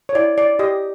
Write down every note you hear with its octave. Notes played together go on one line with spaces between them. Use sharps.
C#5
E4 D5
D5
G4 D#5